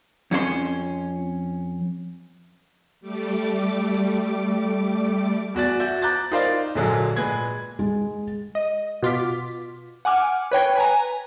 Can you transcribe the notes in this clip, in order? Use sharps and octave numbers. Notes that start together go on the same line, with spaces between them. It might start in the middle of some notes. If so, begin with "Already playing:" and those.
F2 C#4 F#4 C6
G3 A3 D6
E2 F#4 D5 A6
F#4 E5 G6
A#5 D6 F#6 G6 A6
D#4 F4 A#4 C5 D5 F5
A#1 G#2 D3 F#3 G#3 A#3
A#2 G#3 B4 G#6
G#3
D#5
B2 F4 D6 B6
F#5 G#5 D6 F6
B4 C#5 G5 G#6
B4 G#5 A#5